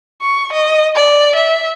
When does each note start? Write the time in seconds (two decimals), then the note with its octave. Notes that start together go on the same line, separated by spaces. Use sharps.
0.22 C#6
0.53 D#5
0.95 D5
1.36 E5